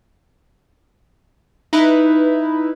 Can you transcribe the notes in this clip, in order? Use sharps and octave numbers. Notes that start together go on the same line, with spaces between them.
D#4 E4 B4